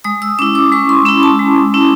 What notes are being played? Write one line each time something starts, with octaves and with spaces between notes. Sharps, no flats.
G#3 D#6
E6
C#4 E4 D6
D6
G#3 C#6
C6
C#4 E4 B5
A5
G#3
C#4 E4